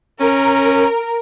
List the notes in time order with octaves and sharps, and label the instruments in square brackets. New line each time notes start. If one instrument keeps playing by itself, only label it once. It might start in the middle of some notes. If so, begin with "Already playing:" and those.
[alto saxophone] C#4 [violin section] A#4